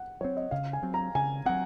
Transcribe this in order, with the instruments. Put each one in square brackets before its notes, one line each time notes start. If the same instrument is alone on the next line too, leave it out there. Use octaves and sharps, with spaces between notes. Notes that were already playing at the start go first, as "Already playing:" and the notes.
Already playing: [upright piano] F#5
[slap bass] F#3 C4 [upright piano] C#5
[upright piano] D#5
[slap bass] C#3 [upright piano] F5
[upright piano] G#5
[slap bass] F#3 C4
[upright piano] A#5
[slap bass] C#3 [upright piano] G#5
[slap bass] F#3 C4 [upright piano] F#5